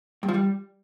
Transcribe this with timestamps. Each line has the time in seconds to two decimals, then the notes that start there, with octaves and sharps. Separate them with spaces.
0.23 G2
0.29 F3
0.34 G3